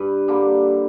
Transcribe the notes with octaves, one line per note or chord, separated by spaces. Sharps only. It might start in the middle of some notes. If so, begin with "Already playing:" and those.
Already playing: G2 B4
D3 G3 A#3